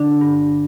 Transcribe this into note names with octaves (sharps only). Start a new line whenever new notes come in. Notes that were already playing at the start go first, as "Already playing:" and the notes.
Already playing: D3 D4
G2